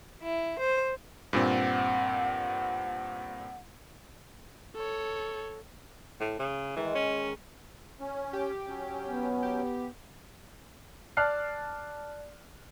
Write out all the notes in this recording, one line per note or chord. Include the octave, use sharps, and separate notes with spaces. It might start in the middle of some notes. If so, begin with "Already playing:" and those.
E4
C5
G2 A#2 C4 F#5
A4 C#5
A2
C#3
D#3 E3 G#3
C#4
C#4
G4
F#3 C#4
B3
G4
D5 A5 F6 F#6 C7